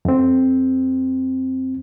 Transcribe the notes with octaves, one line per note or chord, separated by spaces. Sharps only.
F2 C4